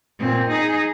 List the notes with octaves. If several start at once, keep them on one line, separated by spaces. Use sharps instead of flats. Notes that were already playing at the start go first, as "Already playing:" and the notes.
A#2 C4
D#4 G#4